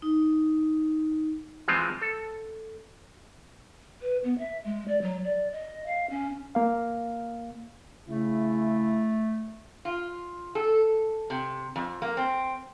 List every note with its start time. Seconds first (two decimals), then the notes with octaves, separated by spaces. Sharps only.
0.02 D#4
1.68 E3 F3 G#3 C4 F4
2.02 A4
4.02 B4
4.24 B3
4.38 E5
4.64 G#3
4.88 D5
5.02 F#3
5.24 D5
5.52 D#5
5.86 F5
6.10 C#4
6.55 A#3 F5
8.09 C#3 A3 E4
9.85 F4
10.55 A4
11.30 C3
11.76 F2
12.02 A#3
12.17 C4